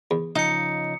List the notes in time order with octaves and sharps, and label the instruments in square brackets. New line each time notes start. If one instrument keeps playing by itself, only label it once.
[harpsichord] E2
[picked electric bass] C#3 F3 [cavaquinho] D#4 [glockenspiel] D#6 C#7